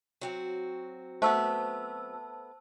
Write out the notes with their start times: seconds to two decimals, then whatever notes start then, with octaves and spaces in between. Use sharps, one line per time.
0.21 F#3 C4 F#4
1.22 A3 B3 C5 A5 E6